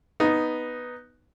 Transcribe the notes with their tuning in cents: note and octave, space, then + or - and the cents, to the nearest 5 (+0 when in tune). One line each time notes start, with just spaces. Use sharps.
B3 +0 D#4 +0